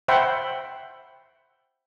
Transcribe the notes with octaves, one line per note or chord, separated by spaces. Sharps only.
C5 E5 F#5 G5 B5 C6